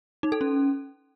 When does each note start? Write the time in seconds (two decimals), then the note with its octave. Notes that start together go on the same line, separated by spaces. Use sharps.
0.23 D#4
0.32 A4
0.41 C#4